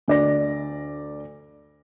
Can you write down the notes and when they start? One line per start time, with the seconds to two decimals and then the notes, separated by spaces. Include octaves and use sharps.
0.08 D2 D5 A#6